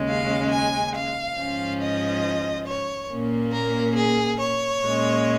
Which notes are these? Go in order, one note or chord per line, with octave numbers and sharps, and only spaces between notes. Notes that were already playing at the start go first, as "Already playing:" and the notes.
Already playing: D#2 C#3 G#3 C#4
F5
G#5
F5
G#2 F3 C#4
D#5
C#5
A#2 A#3 C#4
A#4
G#4
C#5
A#2 G#3 C#4